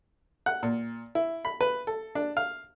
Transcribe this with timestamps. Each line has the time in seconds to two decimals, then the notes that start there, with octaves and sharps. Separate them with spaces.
0.46 F#5
0.63 A#2
1.15 E4
1.45 B5
1.61 B4
1.87 A4
2.15 D4
2.37 F5